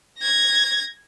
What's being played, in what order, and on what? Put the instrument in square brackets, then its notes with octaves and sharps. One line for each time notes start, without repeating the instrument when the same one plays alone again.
[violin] G#6 A#6